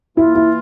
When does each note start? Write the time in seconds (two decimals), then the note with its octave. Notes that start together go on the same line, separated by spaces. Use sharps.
0.17 E3 A#3 E4 F4
0.35 E4